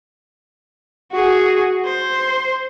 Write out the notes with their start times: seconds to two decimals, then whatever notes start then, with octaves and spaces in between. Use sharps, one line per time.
1.12 F#4 G#4
1.86 C5